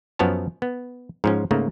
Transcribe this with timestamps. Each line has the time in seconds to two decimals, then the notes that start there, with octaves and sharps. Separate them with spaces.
0.19 F#2 F3 B3 C#5 A5
0.62 B3
1.24 G#2 F3 C#4
1.51 G#2 C#3 A3 A#3